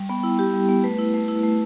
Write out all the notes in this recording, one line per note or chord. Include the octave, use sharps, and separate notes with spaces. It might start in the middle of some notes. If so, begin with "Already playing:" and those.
Already playing: G3
B3 G5
E4
G3 G4
G3
B3
A3 B4
E4
A3
E4
A3